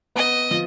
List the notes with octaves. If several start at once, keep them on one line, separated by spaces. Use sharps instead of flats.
B3 D#5
F3